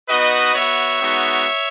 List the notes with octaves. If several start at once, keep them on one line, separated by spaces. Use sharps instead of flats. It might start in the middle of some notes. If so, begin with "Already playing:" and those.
B3 D#4 F#4 B4 D#5
B3 F#4 C#5 E5
G#3 B3 D#4 F#4